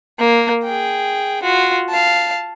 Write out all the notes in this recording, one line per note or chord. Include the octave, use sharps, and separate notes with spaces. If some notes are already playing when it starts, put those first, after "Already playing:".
A#3
G#4 G5
F4 F#4
F5 A5